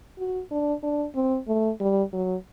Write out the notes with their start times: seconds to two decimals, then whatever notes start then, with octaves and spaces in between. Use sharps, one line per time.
0.19 F#4
0.51 D4
0.83 D4
1.15 C4
1.48 A3
1.80 G3
2.13 F#3